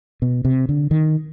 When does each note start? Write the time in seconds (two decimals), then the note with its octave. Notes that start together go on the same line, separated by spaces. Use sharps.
0.22 B2
0.45 C3
0.69 D3
0.91 D#3